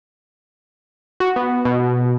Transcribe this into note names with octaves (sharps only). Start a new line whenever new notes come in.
F#4
B3
B2